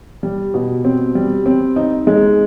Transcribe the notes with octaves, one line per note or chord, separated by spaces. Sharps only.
G3
B2
C4
G3
C4
D#4
G#3